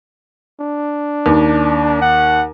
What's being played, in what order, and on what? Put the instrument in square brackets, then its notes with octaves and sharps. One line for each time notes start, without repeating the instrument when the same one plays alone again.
[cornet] D4
[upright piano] D#2
[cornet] F#5